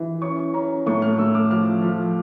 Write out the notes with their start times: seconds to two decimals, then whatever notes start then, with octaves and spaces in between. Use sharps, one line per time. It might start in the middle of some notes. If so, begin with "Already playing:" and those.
Already playing: E3
0.22 C#4 C#6
0.54 C#4 A#5
0.86 A2 C#6
1.02 F6
1.18 A2 E6
1.35 D6
1.50 F3 F6
1.82 F3